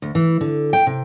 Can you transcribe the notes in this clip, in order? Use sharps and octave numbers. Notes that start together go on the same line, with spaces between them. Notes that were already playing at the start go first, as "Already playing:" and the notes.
D2
E3
D3
G5
C3